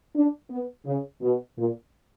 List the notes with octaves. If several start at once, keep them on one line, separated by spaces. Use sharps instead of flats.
D4
B3
C#3
B2
A#2